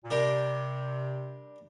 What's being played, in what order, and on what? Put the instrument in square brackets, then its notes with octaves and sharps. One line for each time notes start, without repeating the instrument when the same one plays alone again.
[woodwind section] A#2
[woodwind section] C3 [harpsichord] G3 D4 A#4 D5